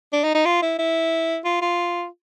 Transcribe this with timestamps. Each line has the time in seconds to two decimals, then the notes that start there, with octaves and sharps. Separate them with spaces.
0.13 D4
0.24 D#4
0.35 D#4
0.46 F4
0.62 E4
0.79 E4
1.45 F4
1.61 F4